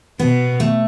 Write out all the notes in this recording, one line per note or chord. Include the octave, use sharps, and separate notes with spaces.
B2 B3
A3